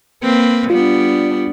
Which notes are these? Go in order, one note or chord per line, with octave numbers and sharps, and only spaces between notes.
A#3 C4 B4
G3 B3 D4 F4